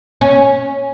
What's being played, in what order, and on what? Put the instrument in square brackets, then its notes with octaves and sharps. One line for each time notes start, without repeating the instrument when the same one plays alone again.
[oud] C#4